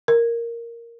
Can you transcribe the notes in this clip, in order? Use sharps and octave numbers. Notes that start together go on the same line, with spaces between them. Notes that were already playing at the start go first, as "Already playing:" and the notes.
A#4